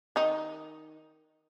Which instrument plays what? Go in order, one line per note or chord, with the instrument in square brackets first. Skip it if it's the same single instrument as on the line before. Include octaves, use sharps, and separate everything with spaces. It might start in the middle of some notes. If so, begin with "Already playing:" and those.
[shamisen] D#3 D#4